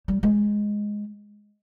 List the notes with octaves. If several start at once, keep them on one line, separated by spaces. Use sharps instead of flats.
G3
G#3